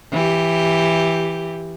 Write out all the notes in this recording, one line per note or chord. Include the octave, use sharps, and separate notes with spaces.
E3 G4